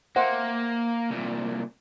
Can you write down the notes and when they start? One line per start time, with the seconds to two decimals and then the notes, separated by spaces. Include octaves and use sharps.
0.16 A#3 C5 E5 F#5
1.10 C2 A#2